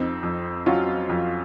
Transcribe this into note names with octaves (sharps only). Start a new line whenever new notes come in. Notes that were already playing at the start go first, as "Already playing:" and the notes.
Already playing: F2 C4 D#4
F2
F#3 C#4 F4
F2